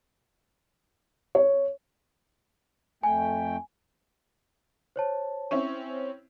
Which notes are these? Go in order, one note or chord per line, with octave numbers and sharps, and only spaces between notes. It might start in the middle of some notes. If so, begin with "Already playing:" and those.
C#5
F2 A3 G5 G#5
C5 C#5 A5
C4 C#4 E4 C#6